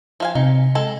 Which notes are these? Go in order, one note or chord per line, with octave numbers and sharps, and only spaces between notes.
F3 F5 G#5
C3 D#4
G#3 A4